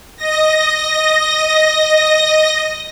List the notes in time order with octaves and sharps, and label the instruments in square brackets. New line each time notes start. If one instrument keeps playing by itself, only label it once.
[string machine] D#5 A#6